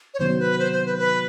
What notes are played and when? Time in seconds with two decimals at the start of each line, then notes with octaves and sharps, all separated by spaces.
0.14 C#5
0.19 C3 D#3 F#3 B3 C5
0.39 B4
0.59 C5
0.72 C5
0.86 B4
0.98 B4